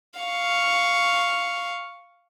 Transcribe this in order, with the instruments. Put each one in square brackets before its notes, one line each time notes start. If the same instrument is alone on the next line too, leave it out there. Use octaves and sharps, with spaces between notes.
[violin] F5 C#6